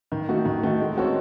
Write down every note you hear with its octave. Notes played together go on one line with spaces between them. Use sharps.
D#3
A3 D#4 F#4
D#3
A3 D#4 F#4
G#3
C4 F#4 A4 C#5